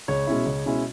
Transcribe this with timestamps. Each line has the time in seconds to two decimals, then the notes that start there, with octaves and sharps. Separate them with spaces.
0.08 C#2 C#5
0.27 B2 G#3 C#4 E4
0.46 C#2
0.66 B2 G#3 C#4 E4